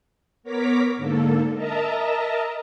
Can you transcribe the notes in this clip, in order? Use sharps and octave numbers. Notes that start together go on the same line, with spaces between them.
B3 A#4 C#5 A#5 D6 B6
G#2 D3 A#3 A4
A#4 D#5 E5 A5 A#5